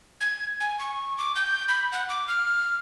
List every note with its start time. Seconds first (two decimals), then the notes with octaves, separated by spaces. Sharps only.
0.21 G#6
0.60 G#5
0.79 C#6
1.18 D6
1.35 G6
1.69 B5
1.92 F#5
2.09 D6
2.28 F6